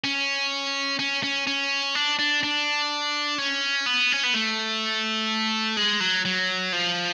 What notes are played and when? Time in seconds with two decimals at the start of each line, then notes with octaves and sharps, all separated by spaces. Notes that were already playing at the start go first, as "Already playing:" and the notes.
0.04 C#4
0.99 C#4
1.23 C#4
1.47 C#4
1.95 D4
2.19 D4
2.43 D4
3.38 C#4
3.86 B3
4.12 C#4
4.24 B3
4.34 A3
5.77 G#3
6.00 F#3
6.25 F#3
6.73 F3